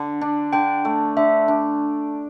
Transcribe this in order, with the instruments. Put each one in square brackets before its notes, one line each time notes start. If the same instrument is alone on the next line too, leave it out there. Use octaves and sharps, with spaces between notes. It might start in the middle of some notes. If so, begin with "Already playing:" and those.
Already playing: [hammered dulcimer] D3
D4
[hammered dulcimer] D3 [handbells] G5
[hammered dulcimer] A3
[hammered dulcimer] D3 [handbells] E5
[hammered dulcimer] D4